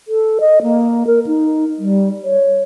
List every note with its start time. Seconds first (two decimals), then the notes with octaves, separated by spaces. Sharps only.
0.08 A4
0.40 D#5
0.63 A#3
1.07 A#4
1.27 D#4
1.79 G3
2.24 C#5